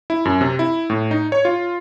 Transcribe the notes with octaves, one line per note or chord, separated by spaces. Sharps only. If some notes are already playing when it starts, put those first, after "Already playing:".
E4
F#2
C3
E4
A2
D#4
C#5
F4